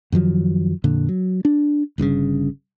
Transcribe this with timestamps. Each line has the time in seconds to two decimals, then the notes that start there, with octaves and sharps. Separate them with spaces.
0.12 F#2 D#3 F3 F#3
0.84 F2 A#2 D3
1.09 F#3
1.45 D4
1.98 G1 G2 A#2 C#3